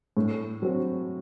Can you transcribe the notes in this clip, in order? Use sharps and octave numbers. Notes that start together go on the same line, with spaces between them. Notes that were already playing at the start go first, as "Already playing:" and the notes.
A2
F#3 C4 F#4